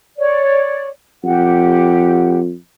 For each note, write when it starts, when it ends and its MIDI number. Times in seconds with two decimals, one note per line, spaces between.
0.18 0.89 73
0.18 0.89 74
1.24 2.53 41
1.24 2.39 67
1.24 2.39 78